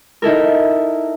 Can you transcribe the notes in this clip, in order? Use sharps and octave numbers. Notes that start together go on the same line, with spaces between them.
D#4 E4 A4 A#4